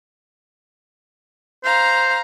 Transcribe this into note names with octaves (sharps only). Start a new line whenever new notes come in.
C5 F5 A#5